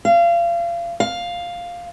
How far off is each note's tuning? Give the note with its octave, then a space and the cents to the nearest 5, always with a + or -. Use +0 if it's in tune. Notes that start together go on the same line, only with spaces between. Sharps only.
F5 -30
F5 +5